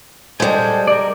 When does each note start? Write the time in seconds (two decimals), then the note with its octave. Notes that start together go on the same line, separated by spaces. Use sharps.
0.40 G3 G#3 A4 C5 G#5
0.87 A#4 D5